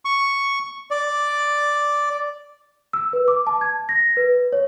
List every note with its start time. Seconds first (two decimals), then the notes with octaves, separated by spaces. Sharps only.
0.05 C#6
0.91 D5
2.93 E6
3.13 B4
3.28 D6
3.47 A5
3.61 G#6
3.89 A#6
4.17 B4
4.52 C#5